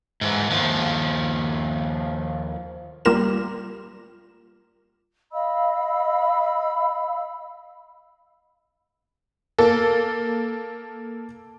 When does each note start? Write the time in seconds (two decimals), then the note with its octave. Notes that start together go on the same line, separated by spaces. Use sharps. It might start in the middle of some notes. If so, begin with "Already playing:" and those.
0.21 G#2 E3
0.50 D#2 F3
3.05 G3 A#3 F4 A#4 E7
5.32 D#5 F5 B5 E6
9.58 A#3 A4